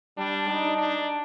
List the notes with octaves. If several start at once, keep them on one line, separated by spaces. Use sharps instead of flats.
G3 D4
D#4
D4